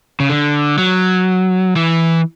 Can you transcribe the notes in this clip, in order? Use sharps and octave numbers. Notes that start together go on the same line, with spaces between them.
C#3
D3
F#3
E3